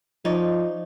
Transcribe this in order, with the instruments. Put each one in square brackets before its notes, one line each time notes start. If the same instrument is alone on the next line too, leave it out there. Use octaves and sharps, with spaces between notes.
[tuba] F3 [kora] D#4 C#5 D5